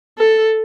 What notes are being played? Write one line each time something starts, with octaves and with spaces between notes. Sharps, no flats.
A4